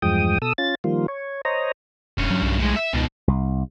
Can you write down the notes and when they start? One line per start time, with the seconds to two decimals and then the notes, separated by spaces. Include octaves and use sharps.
0.02 E2 G2 F3 G#3 G5 D#6
0.42 B2 A4 D#6 E6
0.58 C#4 F4 A6
0.84 D#3 F3 G3 A#3 F4
1.08 C#5
1.45 C5 C#5 D#5 A#5
2.18 E1 G2 C#4
2.30 F#3
2.42 B1
2.59 A2 G#3
2.76 E5
2.93 C#2 B2 D#3
3.28 C2